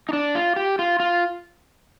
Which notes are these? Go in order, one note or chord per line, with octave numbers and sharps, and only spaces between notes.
D#4
D4
F4
G4
F4
F4